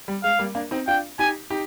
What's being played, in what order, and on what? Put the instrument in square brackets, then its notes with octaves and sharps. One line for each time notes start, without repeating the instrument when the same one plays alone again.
[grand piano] G3
[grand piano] G#3 [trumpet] F5
[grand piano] G3 A#3
A#3 D4
C4 D#4
[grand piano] D4 F4 [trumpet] G5
[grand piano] D#4 G4 [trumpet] G#5
[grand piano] D#4 G4